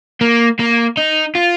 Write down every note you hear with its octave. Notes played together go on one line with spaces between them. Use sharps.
A#3
A#3
D#4
F4